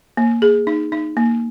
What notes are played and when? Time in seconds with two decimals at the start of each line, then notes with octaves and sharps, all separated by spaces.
0.17 A#3
0.42 G#4
0.67 D#4
0.92 D#4
1.17 A#3